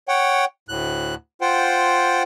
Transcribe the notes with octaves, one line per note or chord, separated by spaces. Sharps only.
C#5 F#5 G5
D2 A2 F#6
F4 C5 F#5 G5